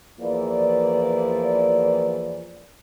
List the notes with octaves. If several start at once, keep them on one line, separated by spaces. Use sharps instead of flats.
E2 E3 F3 A#3 D5